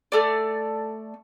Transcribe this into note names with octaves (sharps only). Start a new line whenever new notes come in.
A3 D5